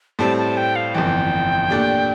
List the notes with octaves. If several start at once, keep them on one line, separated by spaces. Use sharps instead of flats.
A2 G3 C4 A5
A5
G5
F5
G1 F2 E3 G5
A#2 A3 D4 G4